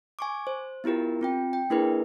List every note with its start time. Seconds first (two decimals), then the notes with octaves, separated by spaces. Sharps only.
0.19 G#5 C#6 D6
0.47 C5
0.84 B3 E4 F4 G4 A#4
1.21 C4 F4 G5
1.53 G5
1.70 A#3 D4 E4 G#4 A#4 B4